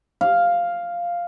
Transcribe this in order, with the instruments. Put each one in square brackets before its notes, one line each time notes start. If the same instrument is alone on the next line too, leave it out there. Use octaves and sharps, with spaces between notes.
[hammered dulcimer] F5